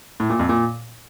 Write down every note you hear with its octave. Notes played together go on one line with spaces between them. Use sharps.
A2
A#2
F2
A#2